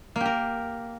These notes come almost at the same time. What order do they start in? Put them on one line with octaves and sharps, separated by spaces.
A#3 G4 A#4